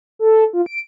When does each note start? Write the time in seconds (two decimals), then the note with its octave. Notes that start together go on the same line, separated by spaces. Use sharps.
0.19 A4
0.53 F4
0.66 D7